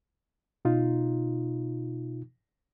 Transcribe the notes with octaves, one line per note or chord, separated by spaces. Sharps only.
B2 D#4 F4